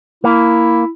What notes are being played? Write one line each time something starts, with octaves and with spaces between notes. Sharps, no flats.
A#3 E4